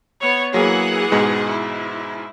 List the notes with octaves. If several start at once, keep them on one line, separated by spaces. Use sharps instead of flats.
B3 C#5
E3 F#3 A#3 G#4 F#5
G#2 B2 G#3
E4